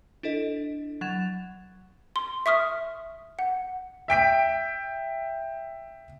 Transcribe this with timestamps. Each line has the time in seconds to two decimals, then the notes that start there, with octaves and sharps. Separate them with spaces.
0.23 D4 E4 A4 D#5
1.01 F#3 F#5 G#6 A6 E7 F7
2.16 C6
2.46 E5 C#6 D#6 F6
3.39 F#5
4.08 E5 G5 B6 D7